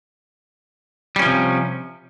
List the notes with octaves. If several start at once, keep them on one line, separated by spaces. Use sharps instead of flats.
C3 F3 G3 C#4